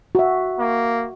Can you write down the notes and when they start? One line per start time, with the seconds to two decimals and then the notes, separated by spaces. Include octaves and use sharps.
0.15 F#4 E5
0.60 A#3